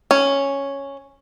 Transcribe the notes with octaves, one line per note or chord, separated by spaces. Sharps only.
C#4